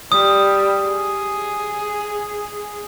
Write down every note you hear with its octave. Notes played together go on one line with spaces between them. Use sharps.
G3 D#6
G#4